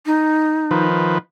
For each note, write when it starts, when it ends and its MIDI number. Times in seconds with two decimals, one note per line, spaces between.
0.06 0.85 63
0.71 1.18 51
0.71 1.18 53
0.71 1.18 71